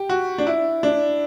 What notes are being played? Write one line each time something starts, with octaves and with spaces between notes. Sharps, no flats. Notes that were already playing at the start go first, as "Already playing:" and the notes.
Already playing: G4
F#4
D4
E4
D4